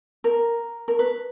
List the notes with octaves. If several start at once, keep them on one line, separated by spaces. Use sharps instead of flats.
A#4
A#4
B4